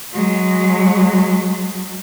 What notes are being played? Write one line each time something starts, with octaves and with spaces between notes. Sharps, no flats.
F#3 G#3